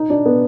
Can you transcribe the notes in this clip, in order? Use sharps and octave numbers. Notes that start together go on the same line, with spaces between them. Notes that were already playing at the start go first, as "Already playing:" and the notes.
Already playing: D#4
D4
B3